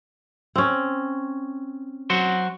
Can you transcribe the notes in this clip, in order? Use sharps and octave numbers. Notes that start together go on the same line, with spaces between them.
C4 C#4
F#3 F#4 C5